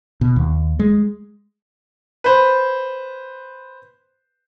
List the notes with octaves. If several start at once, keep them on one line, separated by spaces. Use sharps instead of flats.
B2
D#2
G#3
B4 C5